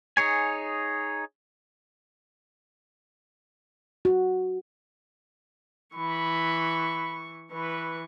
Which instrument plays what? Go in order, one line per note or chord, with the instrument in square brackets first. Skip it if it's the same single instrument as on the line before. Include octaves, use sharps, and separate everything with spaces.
[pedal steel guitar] D#4 G#4 C#5 G#5
[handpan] F#4
[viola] E3 C#6 [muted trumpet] B5
[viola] E3 C#6 [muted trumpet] B4